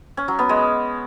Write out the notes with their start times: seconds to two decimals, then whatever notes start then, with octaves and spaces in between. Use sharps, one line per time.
0.17 C#4
0.28 F#3
0.39 B3
0.49 G#3